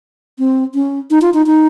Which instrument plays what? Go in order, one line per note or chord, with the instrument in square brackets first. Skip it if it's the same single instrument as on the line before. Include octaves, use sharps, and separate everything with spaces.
[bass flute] C4
C#4
D#4
F4
D#4
D#4